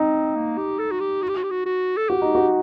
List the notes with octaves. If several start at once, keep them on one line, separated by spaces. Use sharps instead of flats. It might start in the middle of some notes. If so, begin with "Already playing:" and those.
Already playing: C4 D#4
A#3
G4
A4
F#4
G4
F#4
G4
F#4
G4
F#4
F#4
A4
F#4 G4
D#4
F#4